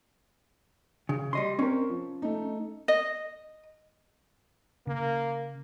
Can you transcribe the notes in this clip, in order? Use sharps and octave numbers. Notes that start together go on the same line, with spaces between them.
C#3
G3 D#5 C6
C4 C#4 A#4
F3
A3 D#4
D#5
C#3 A#3